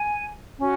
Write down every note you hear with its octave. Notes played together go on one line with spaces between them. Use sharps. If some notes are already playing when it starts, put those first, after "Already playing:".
Already playing: G#5
C#4 F#4